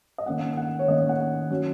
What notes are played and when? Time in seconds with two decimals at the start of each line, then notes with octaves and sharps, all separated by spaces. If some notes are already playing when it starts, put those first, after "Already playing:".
0.18 D#5
0.26 D#3 A#3 C#4 F#5
0.57 F#5
0.79 C#5
0.88 D#3 A#3 C#4 D#5
1.09 F#5
1.50 F#3 C#4